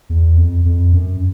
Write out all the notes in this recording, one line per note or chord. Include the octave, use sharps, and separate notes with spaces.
E2
F2
F2
F#2